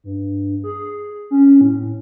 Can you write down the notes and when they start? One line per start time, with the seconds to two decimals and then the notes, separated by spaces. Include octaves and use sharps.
0.04 G2
0.64 G#4
1.31 C#4
1.61 A2